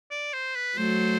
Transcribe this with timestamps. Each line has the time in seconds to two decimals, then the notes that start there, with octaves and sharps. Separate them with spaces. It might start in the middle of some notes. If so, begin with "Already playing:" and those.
0.11 D5
0.33 C5
0.55 B4
0.78 F#3 A3 C5